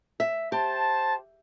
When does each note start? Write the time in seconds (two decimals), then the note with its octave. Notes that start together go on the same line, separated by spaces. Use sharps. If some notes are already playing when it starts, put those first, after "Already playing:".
0.20 E5
0.52 G4 C5 A5